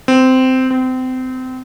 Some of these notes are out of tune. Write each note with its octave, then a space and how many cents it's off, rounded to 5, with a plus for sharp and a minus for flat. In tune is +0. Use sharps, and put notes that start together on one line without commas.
C4 -15
C4 -30